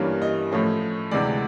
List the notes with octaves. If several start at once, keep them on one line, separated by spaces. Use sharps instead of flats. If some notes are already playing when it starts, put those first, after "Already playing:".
Already playing: G2 E3 G3 A#3 C#4
D#5
A2 F3 A3 C#4
D2 C3 E3 G#3 D5